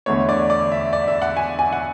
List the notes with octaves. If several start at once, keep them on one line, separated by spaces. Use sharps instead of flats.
E2 D3 A3 C#5
D5
D5
E5
D5
E5
F#5
G#5
G#5
F#5